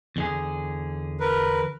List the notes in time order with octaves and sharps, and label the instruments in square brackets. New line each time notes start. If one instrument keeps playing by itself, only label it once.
[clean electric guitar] E2 D3 G#4
[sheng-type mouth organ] A#4 B4